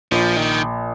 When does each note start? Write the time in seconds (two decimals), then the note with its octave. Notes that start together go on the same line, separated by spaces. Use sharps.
0.11 A#1 F3
0.37 D#3